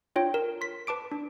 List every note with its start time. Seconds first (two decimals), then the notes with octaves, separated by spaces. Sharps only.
0.16 D4 F4 C#5 G5
0.34 A#4
0.61 C6 B6
0.87 B4 A5 D6 D7
1.12 D4